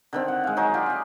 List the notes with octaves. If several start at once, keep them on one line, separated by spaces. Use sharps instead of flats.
D3 D#3 C4
F#5
G#3 F5
F#3 D#4 G#4 C#5
F4 G4 D5
G#4 D#5